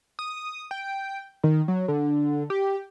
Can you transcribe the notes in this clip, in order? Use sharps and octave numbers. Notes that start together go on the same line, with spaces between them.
D#6
G5
D#3
F#3
D3
G4